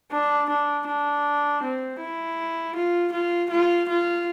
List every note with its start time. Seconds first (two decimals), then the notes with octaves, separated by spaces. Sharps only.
0.12 D4
0.49 D4
0.87 D4
1.62 C4
2.00 E4
2.76 F4
3.12 F4
3.50 F4
3.89 F4